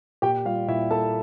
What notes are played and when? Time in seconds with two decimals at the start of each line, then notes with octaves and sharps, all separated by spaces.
0.22 A#2 G4 G5
0.45 G3 F4 F5
0.68 A#2 E4 E5
0.91 A#3 A4 A5